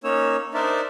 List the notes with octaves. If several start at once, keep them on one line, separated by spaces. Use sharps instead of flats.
A#3 C#4 D#4 C#5 E6
D4 D#4 A#4 C5 D5 E5